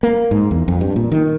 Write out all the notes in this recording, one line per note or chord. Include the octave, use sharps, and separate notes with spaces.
A#3
G#2
E2
F2
G2
A#2
D#3